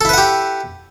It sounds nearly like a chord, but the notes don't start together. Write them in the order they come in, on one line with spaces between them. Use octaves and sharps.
A4 E4 B4 F#5 G4